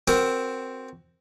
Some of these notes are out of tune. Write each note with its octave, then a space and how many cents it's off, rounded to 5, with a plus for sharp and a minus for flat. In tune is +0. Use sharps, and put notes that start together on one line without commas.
C4 +0 F#4 +25 A#4 +0